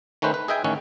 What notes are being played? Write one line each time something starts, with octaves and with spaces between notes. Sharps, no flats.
D#3 A3 C#4 B4 C5
B4
G#4 D#5 E5 G5 G#5
A1 D#3 C#4 F#5